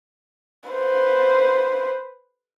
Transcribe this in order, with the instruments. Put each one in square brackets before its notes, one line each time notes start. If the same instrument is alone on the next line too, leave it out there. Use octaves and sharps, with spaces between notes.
[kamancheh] B4 C5